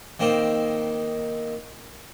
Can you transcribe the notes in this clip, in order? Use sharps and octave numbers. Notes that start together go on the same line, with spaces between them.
D#3 A#3 C4 D#4